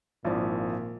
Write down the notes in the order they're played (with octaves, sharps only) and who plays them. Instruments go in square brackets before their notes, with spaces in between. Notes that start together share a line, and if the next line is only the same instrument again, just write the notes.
[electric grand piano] G#1 F3 [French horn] A#2 [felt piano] E4 D5